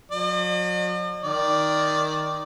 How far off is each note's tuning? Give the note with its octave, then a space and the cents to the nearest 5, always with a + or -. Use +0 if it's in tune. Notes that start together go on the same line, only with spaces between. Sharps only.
F#3 -40 D#5 -45
D#3 +5 D5 +0